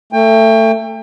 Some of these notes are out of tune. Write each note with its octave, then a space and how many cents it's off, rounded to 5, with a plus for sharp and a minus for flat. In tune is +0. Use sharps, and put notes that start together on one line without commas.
A3 +20 G5 +30